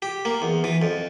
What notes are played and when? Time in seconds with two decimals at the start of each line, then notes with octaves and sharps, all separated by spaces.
0.02 G4
0.25 A#3
0.42 E2
0.64 E3
0.82 F2